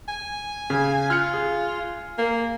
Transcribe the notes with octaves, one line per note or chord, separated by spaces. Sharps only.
G#5
C#3
F4 F6 F#6 C#7
G#4
A#3